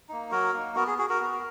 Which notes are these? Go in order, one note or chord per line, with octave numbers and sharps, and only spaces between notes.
A#3 D#4
F#3 F#4 A#4
A#3 D#4
B3 F#4 A#4
G#4
F#4 G#4
F#4 A#4
B3